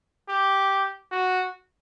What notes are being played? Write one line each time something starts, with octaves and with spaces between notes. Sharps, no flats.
G4
F#4